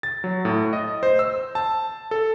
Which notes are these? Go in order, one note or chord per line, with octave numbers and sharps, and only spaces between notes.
A6
F#3
A2
D#5
C5
E6
A5
A4